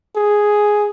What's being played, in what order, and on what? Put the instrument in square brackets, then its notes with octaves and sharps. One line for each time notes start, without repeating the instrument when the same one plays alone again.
[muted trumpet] G#4